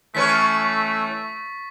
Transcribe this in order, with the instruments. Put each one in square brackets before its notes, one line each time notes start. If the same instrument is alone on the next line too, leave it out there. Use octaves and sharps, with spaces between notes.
[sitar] E3 C#4 B4 [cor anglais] A3 [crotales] C#6 A6 B6